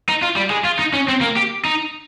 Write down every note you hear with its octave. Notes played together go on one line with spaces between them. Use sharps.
D#4
F4
G3
G#3
F4
D#4
C#4
C4
A#3
G4
D#4